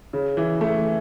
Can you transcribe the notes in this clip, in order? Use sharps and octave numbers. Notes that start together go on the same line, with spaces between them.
C#3
E3
A3